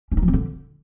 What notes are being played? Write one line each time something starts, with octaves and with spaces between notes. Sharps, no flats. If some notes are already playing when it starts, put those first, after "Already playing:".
C#4
D#4
F3
C4
D3